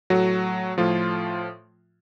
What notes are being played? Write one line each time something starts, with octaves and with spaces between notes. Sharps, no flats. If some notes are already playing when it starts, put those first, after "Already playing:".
A2 F#3 A3 F#4
A2 F3 A3 F4